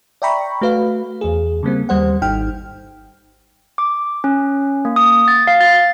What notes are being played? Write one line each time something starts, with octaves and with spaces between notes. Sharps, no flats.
D5 E5 G5 A#5 B5 C#6
A3 F#4 B4 F5
E2 G#4
C#3 G3 A#3 C4
D#2 G3 C5 F#5
G#1 D#4 G5 F6
D6
C#4
A#3
D#6
A6
F5
A6